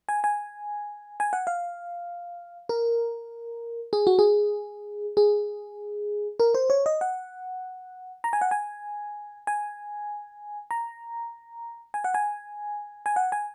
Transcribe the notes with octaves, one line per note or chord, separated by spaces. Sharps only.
G#5
G#5
G#5
F#5
F5
A#4
G#4
F#4
G#4
G#4
A#4
C5
C#5
D#5
F#5
A#5
G#5
F#5
G#5
G#5
A#5
G#5
F#5
G#5
G#5
F#5
G#5